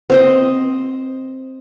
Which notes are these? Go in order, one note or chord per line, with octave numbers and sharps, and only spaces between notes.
C4 C5 D#5